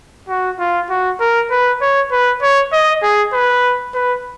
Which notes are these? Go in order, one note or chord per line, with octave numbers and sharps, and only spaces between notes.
F#4
F4
F#4
A#4
B4
C#5
B4
C#5
D#5
G#4
B4
B4